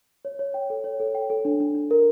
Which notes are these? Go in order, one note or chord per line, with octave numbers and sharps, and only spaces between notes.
C#5
C#5
G5
A4
C#5
A4
G5
A4
D4
D4
D4
A#4